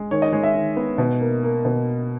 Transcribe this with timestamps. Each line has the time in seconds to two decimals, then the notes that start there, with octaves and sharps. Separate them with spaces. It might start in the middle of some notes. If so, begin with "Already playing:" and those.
Already playing: G#3
0.11 D#3 C#5
0.22 D#5
0.32 G#3 C#5
0.44 E5
0.55 D#3
0.77 B3
0.98 B2
1.20 A#3
1.43 A#3
1.65 B2